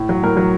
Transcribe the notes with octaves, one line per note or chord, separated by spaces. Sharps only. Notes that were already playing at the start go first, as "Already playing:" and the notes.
Already playing: A2
F#3
A2 A#4
F#3